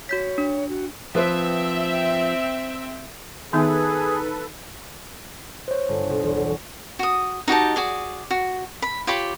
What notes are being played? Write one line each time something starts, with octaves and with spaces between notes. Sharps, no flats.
F#4 C#5 G6 B6
D4
F#4
F3 C4 B4 C5 E5
D#3 B3 D#4 G#4 A4 B4 E5
C5 C#5
G1
B1
E2
C#6
F#4 D#6
D#4 F#4 G4 A5
F#4 G#4 D5
F#4
B5
F4 G4 C#5 B5